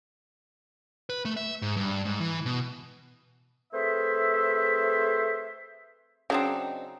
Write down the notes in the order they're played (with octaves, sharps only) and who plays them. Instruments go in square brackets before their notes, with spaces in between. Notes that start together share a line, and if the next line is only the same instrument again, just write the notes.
[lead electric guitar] B4
A3
E5
G#2
G2
G#2
E3
B2
[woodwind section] A3 C4 G#4 B4 C5 E5
[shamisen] C#3 F#3 [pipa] C4 D4 D#4